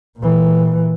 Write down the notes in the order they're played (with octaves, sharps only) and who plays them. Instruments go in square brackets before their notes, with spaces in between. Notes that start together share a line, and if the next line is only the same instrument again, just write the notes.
[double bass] A#2 E3